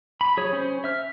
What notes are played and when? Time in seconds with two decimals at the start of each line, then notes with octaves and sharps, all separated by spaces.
0.21 B5
0.37 F#3 G#4 C#5
0.53 C#4 C5
0.84 E5 F6